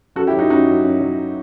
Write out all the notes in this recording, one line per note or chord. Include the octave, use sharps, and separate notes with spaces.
F#2 F#4 A4
E4 G4
F#3
D#4 F#4
F#2 D#4 F#4
F#3
F#2
F#3